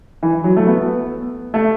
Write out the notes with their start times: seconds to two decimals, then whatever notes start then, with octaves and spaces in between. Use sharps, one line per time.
0.23 E3
0.44 F#3
0.57 A3
0.67 B3
1.54 A3